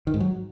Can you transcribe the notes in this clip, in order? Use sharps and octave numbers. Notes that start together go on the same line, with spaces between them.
D#3
G#2
F#3